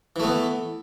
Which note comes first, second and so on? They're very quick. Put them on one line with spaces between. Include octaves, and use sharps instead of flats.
E3 A3 B3